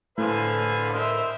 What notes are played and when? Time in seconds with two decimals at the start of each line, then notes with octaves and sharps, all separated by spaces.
0.18 A2 D3 B4 C5 F5 G#5
0.93 A#4 C5 D#5 E5